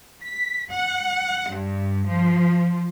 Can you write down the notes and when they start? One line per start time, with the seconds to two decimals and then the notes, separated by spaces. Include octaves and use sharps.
0.22 B6
0.70 F#5
1.50 G2
2.08 F3